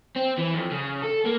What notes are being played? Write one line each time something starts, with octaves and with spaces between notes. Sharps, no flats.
C4
E3
F2
C#3
A4
A#3